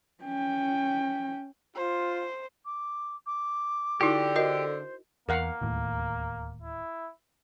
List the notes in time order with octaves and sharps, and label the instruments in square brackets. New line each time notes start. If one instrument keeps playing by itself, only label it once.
[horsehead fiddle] C#4 G5
[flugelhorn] F4 [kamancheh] C5
[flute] D6
D6
[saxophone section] D3 [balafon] D#4 E4 F#4 [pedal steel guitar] G4
[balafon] F#4 A#4 D#5 [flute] C5
[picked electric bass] E2 [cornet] A#3 [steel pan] A#4 F5 F#5
[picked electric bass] D1 D#2 A2
[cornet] E4